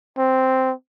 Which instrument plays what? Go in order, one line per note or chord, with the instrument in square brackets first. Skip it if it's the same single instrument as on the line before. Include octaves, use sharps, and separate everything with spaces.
[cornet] C4